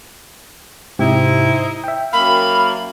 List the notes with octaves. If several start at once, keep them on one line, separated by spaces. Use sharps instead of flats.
G#2 C3 D#4 E4 G4 C5
E5 G5
F#2 A#3 F5 B5